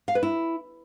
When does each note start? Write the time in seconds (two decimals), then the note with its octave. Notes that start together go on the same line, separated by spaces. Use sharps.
0.08 F5
0.15 B4
0.23 E4